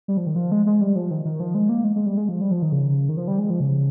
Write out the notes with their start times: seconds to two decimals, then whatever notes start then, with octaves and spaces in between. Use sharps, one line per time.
0.08 G3
0.17 F3
0.27 D#3
0.36 F3
0.52 G#3
0.66 G#3
0.81 G3
0.96 F3
1.11 D#3
1.25 D#3
1.40 F3
1.55 G#3
1.69 A#3
1.84 G#3
1.96 G#3
2.06 G3
2.17 G#3
2.29 F3
2.41 G3
2.51 F3
2.62 D#3
2.72 C#3
3.09 D#3
3.17 F3
3.28 G3
3.38 G#3
3.50 F3
3.60 C#3